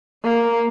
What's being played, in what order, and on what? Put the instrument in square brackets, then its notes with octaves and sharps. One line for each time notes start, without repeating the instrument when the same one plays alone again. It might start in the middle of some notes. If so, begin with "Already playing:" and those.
[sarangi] A#3